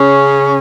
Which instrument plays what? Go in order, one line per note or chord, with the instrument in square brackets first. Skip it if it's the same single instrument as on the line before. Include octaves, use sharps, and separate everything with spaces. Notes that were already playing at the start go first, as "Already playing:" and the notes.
Already playing: [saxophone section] C#3 C#4